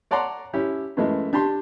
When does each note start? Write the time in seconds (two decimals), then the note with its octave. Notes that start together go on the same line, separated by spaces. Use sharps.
0.11 C#5 D5 F#5 A5 A#5 C6
0.53 C#4 E4 G4
0.97 F#2 E3 G#3 A3
1.33 D4 G4 A5 C6